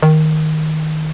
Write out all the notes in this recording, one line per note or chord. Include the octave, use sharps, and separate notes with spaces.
D#3